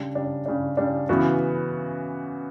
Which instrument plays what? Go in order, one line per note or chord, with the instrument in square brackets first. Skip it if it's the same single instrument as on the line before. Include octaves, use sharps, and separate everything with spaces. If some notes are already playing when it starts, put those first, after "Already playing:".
Already playing: [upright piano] C#3 G3 D4
C#3 G3 D4
C#3 G3 D4
C#3 G3 D4
C#3 E3 B3 F#4